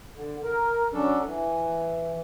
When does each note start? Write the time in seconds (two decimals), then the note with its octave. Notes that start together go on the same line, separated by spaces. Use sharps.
0.16 D3
0.44 A#4
0.93 F#3 C#4 D4 A4
1.25 E3